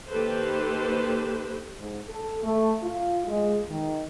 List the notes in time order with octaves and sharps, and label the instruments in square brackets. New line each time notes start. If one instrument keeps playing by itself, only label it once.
[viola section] D#3 A#3 G4 A4 B4 C5
[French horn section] G#2
A4
A3
F4
G#3
D#3